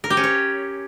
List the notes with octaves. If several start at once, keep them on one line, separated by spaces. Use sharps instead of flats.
A#4
G4
C#4
C#5